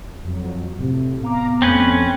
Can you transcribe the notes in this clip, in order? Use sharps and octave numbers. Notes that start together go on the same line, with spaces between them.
F2 F#3
A2 C3
B3 F5 A#5 D6
F2 A3 C4 C#4 B4